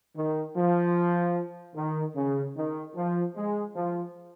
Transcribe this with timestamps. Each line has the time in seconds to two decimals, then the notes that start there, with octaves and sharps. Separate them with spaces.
0.16 D#3
0.57 F3
1.76 D#3
2.16 C#3
2.56 D#3
2.96 F3
3.36 G#3
3.76 F3